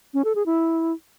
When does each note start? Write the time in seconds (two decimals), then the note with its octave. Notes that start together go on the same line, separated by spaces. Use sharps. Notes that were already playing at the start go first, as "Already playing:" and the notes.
0.14 C#4
0.24 A4
0.35 G#4
0.46 E4